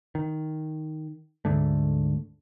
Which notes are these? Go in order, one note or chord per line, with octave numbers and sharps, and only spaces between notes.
D#3
D2 G#2 D3 A3